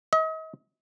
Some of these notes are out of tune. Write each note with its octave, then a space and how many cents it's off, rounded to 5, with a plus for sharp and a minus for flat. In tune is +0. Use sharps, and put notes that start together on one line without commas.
D#5 +40